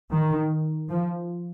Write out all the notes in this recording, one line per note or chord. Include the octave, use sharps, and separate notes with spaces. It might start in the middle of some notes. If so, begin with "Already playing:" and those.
D#3
F3